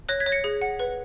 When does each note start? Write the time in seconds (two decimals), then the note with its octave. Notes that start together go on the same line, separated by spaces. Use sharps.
0.09 C#5 F#6 A#6
0.20 G#6 B6
0.26 C#5
0.32 A#6 C#7
0.44 G#4
0.61 F#5
0.79 B4